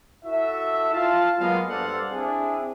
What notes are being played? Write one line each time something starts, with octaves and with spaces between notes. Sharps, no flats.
E4 F#4 A4 E5
F4 F5 A5
F#3 G#3 A#3 B3 D#5 F5
G2 A4 C5 D5 F5 F#5
C4 D4 E4 G#4